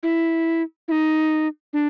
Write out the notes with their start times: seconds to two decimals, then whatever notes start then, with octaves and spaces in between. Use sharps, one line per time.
0.03 E4
0.88 E4
0.92 D#4
1.73 D4